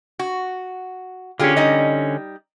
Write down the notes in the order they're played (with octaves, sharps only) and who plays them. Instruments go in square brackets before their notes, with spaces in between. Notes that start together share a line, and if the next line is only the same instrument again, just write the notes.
[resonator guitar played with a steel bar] F#4
[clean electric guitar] D3 C#4 [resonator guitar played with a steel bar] F4 G4 G#4
[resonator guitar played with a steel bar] G3 D#4 D#5